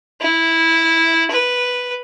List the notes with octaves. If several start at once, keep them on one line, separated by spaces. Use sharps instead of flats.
E4
B4